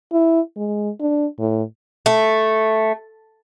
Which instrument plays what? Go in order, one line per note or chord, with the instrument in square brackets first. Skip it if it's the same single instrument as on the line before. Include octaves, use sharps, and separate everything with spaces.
[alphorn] E4
G#3
D4
A2
[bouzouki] A3